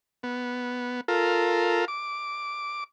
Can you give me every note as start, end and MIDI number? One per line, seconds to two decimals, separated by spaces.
0.23 1.01 59
1.08 1.85 65
1.08 1.85 69
1.08 1.85 70
1.88 2.84 86